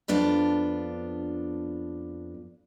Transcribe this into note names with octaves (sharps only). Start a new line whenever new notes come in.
F2 B3 D4 F4